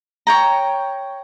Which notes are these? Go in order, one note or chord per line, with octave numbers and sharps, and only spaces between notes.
C#5 G5 A#5